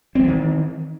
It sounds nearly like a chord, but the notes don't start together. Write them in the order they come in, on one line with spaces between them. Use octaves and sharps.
C4 G3 E3 D#3